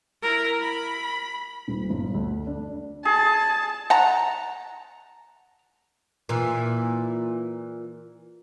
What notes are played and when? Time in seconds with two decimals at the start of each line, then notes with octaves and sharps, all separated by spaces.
0.22 E4 A#4
0.60 B5
1.68 D#1
1.90 G1
2.14 D2
2.47 D4
3.05 G#4 A5
3.90 F#5 A5 A#5
6.29 A#2 E3